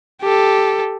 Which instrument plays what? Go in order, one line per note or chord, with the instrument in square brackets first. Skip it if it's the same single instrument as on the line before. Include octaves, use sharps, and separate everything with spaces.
[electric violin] G4 A4